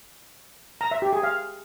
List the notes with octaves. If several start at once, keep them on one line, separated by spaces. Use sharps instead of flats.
A#5
E5
G4
G#4
F5